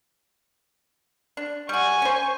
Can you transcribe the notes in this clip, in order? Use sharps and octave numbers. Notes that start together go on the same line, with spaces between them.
D4
G3 F#4 G#5 C#6
C#4 C5